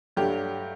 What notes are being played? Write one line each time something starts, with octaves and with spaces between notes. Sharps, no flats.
G2 F#3 A3 G4